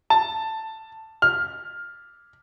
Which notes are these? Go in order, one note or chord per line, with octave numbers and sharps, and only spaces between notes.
A5
F6